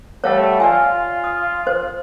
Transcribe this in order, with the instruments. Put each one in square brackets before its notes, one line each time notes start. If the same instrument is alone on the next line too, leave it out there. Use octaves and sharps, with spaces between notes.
[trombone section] G3 A3 [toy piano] C#5 F5 F#5
[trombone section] F4 [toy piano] D5 E5 G#5
[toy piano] D#6
C5